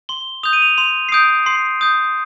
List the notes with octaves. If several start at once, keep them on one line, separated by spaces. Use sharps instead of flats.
C6 G7
D#6 G6 F7
D#7
F7
C6 F7
C7
D#6 G6 D7
C6 C7
D#6 G6